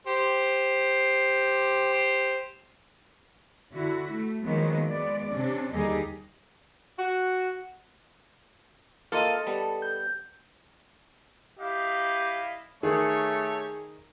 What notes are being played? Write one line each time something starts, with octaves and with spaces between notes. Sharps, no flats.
G4 C5
D3 E4 F#4
A3
D#3 F3 F#3 G#3 A#3 B3
G#3 B3 D5
C3 C#4 D4
D#2 D3 G3 D#4 G4 G#4
F#4
A#3 F4 A4 D#5 F6
G3 B3 A5
G6
E4 G4 D#5 F5
D#3 A3 G4 G#4 C#5